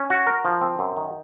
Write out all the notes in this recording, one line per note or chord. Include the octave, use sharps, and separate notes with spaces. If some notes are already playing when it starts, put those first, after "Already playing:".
Already playing: C#4
F#4
A#4
F3
C4
F#2
D#3